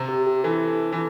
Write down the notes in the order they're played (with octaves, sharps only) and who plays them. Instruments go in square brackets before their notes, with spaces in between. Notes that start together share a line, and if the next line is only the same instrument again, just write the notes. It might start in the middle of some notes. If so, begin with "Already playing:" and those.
Already playing: [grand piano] C3
[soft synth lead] G4
G4
[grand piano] E3 [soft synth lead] A4
[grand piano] E3